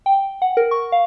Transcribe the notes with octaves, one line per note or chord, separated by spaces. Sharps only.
G5
F#5
A#4
C#6
F5